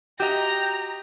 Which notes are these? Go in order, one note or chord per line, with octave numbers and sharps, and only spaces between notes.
F#4 G4 D#5 G5 A#5